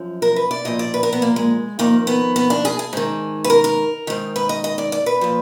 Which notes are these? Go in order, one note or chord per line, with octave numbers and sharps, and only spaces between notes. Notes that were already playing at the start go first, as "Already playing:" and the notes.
Already playing: F#2 F3
A#4
B4
D5
A#2 F3 D#5
D5
B4
A#4
B3
A#3
G#3
F2 D#3 A#3
B3
B3
D4
G#4
G#4
G#2 D#3
B4
A#4
A#4
G#2 D#3
B4
D#5
D#5
D5
D5
B4
A#2 F3